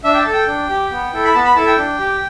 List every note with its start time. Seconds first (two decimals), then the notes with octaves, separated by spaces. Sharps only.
0.04 D4 E5
0.14 G5
0.18 A5
0.26 A4
0.33 G5
0.47 D4
0.69 G4
0.91 B3
1.13 E4 A4
1.24 B5
1.34 B3 A5
1.45 B5
1.55 E4 A4 A5
1.67 G5
1.78 D4
1.99 G4